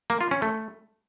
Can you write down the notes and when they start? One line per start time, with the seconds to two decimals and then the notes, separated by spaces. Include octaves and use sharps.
0.10 A#3
0.21 F4
0.31 C#4
0.42 A3